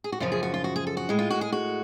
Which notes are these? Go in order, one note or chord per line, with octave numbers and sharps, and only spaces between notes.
G#4
F#4
F#2 C#3 F3 F4
G#4
F#4
F4
F#4
G#4
A4
F#4
A2 G#3
F4
F#4
G#4
F#4